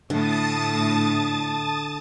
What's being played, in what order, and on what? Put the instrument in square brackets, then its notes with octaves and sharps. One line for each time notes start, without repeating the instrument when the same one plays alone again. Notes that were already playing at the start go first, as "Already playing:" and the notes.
[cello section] A2 [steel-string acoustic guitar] D3 [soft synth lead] D4 [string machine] A5 D#6 A6